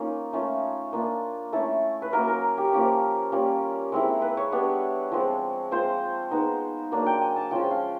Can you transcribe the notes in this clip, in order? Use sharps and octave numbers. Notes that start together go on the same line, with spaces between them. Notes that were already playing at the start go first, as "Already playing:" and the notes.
Already playing: A#3 C#4 D#4 F4
A3 C#4 F4
A#3 D4 F4
A3 C#4 E4 A4
B4
F#3 A#3 C#4 A#4
A#4
G4
F3 A#3 C#4
G3 A#3 C#4 F4
G#3 C4 E4
B4
C#5
G3 B3 D4
F3 G#3 C4
F3 G#3 C4 F4 C5
G#3 B3 D#4
F#3 A#3 D4
G5
G#5
A5
F3 G#3 C#4 F4 G5
F5